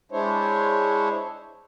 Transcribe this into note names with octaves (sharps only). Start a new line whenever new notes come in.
G#3 D4 E4 C5 C#5